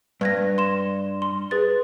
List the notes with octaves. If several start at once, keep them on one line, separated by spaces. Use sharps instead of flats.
G2 B4 G#6 A#6
C6 E7
C6
G#4 B4 A6